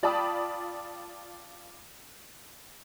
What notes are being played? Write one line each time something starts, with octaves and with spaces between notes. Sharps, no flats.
F4 D5 G5 A5 B5 D#6